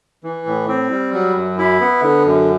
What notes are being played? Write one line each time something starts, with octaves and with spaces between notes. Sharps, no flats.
E3
A2
C4
G3
F#3
F#2
E4
B3
D3
F#2